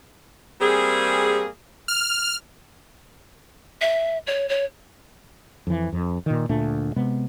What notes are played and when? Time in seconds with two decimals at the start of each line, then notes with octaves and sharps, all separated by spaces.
0.61 G3 A#3 C4 G#4
1.88 F6
3.81 E5
4.27 C#5
4.49 C#5
5.67 F2 E3
5.93 F2
6.26 A#2 D#3
6.49 D2 A#2 A3 D4
6.96 C3 G#3 B3